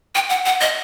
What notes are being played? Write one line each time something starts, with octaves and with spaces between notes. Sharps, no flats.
G5
F#5
F#5
D#5